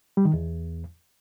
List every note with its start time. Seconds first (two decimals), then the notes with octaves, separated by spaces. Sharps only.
0.17 G3
0.25 D#3
0.34 E2